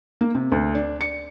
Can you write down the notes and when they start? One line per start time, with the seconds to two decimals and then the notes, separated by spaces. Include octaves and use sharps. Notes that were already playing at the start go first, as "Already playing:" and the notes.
0.21 A#3
0.35 C3
0.52 D2
0.75 D4
1.01 C#7